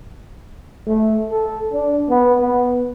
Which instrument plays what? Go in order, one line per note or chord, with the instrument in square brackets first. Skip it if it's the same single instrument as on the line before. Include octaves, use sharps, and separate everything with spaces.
[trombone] A3
A4
D4
B3
B3